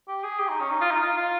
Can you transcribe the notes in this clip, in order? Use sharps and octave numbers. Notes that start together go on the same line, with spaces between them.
G4
G#4
G4
D#4
C#4
D#4
F4
D#4
F4
F4